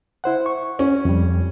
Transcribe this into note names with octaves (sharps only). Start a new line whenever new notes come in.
E4 C5 F#5
C#6
C#4
F2 G3